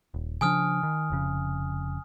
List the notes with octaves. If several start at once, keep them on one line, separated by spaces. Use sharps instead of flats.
D#1
C#3 F3 D4 G#5 D#6 F6
D#3
F1 F2 C#3